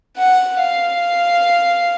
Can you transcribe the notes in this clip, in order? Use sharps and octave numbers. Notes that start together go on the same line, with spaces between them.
F#5
F5